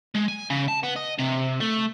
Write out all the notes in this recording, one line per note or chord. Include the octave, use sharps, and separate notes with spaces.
G#3
G#5
C#3
A5
B3
D#5
C3
A3